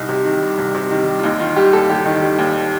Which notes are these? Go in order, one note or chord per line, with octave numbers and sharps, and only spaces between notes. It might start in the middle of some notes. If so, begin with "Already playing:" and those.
Already playing: C2 D#4
C3
D#3
G3
C2
C3
D#3
G3
F4
D#2 D#4
D#3 F4
G3 G4
D#2 A4
D#2 G4
D#3
G3
D#2